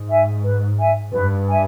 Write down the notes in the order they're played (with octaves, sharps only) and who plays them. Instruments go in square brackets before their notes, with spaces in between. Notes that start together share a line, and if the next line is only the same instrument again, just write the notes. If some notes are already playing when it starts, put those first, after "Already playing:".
Already playing: [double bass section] G#2
[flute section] E5 G#5
B4
E5 G#5
[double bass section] G2 [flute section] B4
[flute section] E5 G#5